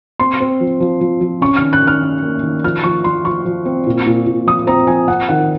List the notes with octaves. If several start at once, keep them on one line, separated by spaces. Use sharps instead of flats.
C4 C6
C4
F3
F3
F3
F3
C#4 C#6
F6
D#3
F#6
D#3
F6
C#4
A#3
D#3
F3 F6
F3 C#6
F3 C6
F3 C#6
F3
C4
A#2
A#2
A#2
F3 D#6
C4 A#5
F3 G#5
C4 F#5
D#3 F#5